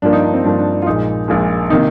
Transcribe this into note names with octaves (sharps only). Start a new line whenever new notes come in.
G2 F3 A#3 D4
D#4
D4
C4
G2 F3 A#3 D4
D4
D4
F4
A#1 A#2 G#3 D#4
A#1 A#2 G#3
C3 D#3 A#3 D#4